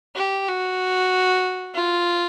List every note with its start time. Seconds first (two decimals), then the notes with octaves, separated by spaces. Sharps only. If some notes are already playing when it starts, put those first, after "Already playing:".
0.16 G4
0.48 F#4
1.75 F4